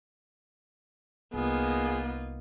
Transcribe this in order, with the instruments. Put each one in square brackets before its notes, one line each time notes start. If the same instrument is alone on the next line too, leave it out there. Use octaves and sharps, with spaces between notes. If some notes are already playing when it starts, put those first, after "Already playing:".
[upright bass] C2 [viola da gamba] A#3 D#4 F4 [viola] B3 [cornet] G#4